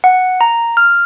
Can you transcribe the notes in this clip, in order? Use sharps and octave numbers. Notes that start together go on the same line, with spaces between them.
F#5
A#5
F6